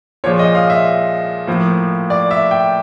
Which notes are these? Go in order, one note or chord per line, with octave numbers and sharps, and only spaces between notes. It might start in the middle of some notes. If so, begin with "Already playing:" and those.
A#2 F3 G#3 C#5
D#5
F5
E5
A2 F3 A#3
D5
E5
G5